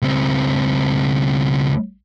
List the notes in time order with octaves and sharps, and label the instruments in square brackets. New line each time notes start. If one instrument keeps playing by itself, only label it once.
[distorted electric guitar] C#2 C4